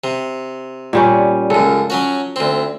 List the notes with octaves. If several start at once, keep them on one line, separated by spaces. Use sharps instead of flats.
C3
A#2 G3 C#4
C#2 F#2 A4
F#3 C#4 F#4
D2 C4